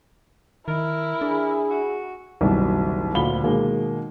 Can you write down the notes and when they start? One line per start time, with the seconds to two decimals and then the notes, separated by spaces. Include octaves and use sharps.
0.68 D#3 E4 A#4
1.21 D4 G#4
1.70 F#4
2.41 F#1 C2 B2 D#3
3.15 D2 A#2 F5 B5 G7
3.43 B2 D#3 G#3 A#3